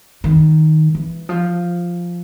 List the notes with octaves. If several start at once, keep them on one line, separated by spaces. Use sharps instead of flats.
D#3
E3
F3